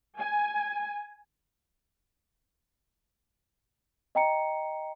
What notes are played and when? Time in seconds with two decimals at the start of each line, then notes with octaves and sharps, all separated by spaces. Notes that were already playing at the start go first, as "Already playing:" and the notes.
0.18 G#5
4.15 D#5 G5 A#5 C#7